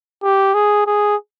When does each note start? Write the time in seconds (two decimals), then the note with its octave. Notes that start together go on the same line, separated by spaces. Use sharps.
0.23 G4
0.54 G#4
0.87 G#4